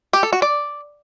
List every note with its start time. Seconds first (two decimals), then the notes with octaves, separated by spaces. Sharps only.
0.13 G4
0.23 A4
0.33 F#4
0.42 D5